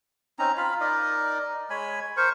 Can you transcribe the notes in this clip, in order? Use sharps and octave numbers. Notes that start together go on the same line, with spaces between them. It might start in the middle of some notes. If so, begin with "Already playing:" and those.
C4 C#4 D#4 A#5
F4 F5 B5
D#4 A#4 D5 D#5
G#3 C#5 G#5 B5
A#4 C5 C#6